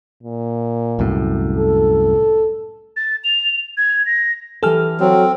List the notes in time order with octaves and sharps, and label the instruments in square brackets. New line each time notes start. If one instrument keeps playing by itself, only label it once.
[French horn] A#2
[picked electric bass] C2 F#2 A2
[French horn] A4
[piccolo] A6
F7
G#6
A#6
[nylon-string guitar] E3 G4 G#5 [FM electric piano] A4 F6
[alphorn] F#3 [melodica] C4